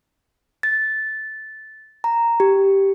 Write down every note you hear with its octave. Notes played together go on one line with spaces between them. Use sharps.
A6
A#5
G4